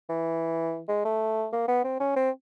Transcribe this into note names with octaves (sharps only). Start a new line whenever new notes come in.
E3
G#3
A3
A#3
B3
C4
C#4
C4